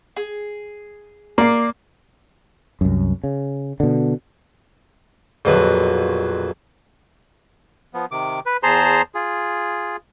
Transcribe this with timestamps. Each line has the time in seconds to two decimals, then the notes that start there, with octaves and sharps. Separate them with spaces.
0.17 G#4
1.38 A#3 D5 C6
2.81 C2 F#2
3.24 C#3
3.80 B2 D3
5.45 A#1 F2 B2 F#3 B4
7.94 F3 B3
8.11 C3 D#3 D6
8.46 B4
8.63 E2 G#4 C5 A5 A#5 C6
9.15 F4 G#4